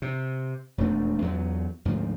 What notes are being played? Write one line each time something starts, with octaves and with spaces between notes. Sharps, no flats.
C3
E1 F2 A3 D4
E2 F#3
D2 G#2 C#3 F3